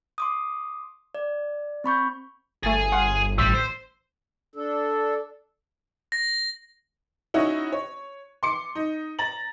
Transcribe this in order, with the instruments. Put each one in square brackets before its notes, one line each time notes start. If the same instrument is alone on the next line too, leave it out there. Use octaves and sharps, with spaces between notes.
[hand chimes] C6 D6 D#6
D5
C4 B5 C#6 G6
[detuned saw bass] G1 [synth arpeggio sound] A3 A6 [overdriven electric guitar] G#4 G#5
[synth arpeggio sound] F5 F#5 C6
[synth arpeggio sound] A1 C6 B6 [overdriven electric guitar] G3 [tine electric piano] E6
[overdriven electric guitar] C5
[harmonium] D4 A4
[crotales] A#6
[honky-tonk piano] C#4 D#4 E4 F#4 C#5
C#5
C6 D6 C#7
D#4
A#5 A6 F#7